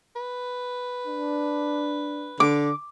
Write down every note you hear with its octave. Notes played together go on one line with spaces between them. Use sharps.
B4
D4
D3 D6